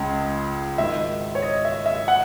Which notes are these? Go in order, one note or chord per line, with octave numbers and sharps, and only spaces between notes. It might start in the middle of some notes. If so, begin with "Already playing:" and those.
Already playing: C#2 C#3
G#1 G#2 D#3 E5
C#5
D#5
E5
E5
F#5